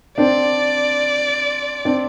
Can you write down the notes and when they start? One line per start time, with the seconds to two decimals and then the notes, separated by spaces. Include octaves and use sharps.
0.18 C4 D4 D5
1.85 C4 D4